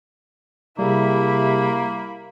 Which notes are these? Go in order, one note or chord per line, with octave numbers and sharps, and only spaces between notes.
C3 G3 A#3 E4 G#4 B5